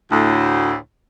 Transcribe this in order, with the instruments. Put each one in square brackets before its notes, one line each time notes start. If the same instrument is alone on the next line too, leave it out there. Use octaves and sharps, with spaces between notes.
[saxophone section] D2 A2